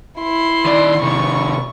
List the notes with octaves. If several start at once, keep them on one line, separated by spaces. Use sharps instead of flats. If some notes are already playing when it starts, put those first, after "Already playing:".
E4 C6
D#3 D5
C3 D#3 C#6